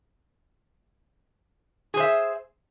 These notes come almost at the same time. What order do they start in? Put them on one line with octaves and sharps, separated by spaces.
G#4 C5 E5